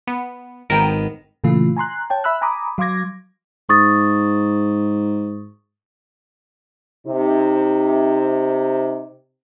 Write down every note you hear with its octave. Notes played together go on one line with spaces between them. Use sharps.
B3
G#1 G#2 D#3 B3 A#4 G5
A#2 C#3 E3 A3 F4
G#5 A#5 C6 F#6
C#5 G5 A5
E5 B5 E6 F#6
G#5 A#5 B5 D6 D#6
F#3 F5 C6 D6 G#6 A#6
G#2 C#6 D#6 A6
C3 D#4